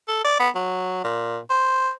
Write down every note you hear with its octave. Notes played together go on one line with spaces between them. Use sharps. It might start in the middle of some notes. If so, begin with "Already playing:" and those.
A4
D5
B3
F#3
A#2
C5